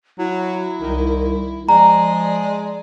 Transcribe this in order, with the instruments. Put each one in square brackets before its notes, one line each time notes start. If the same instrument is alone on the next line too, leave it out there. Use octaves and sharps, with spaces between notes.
[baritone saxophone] F#3 [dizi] E4
[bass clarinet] C2 [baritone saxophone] D#3
[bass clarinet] F3 [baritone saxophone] G#3 [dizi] D5 [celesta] A#5